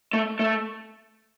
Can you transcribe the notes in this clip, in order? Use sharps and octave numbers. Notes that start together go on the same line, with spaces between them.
A3
A3